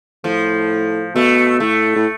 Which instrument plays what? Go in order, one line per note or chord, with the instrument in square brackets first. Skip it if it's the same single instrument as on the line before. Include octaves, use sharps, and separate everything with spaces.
[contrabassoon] A2 [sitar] F3
[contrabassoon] B2 [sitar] A3
[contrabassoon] A2 [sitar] A3
[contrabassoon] A2